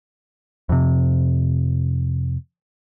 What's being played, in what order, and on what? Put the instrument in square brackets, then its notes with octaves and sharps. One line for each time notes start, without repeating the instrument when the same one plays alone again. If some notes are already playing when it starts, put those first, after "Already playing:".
[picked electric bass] F2 C3